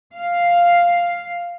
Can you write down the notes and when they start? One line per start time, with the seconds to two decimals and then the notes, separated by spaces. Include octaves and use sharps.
0.13 F5